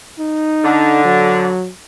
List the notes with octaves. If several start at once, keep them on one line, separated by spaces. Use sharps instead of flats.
D#4
D3
F#3